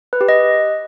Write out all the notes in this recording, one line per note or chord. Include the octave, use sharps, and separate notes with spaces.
B4
G4
D#5